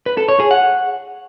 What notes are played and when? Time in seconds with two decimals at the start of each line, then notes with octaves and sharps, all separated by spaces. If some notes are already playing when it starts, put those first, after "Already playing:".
0.06 B4
0.17 A4
0.29 C#5
0.40 G#4
0.51 F#5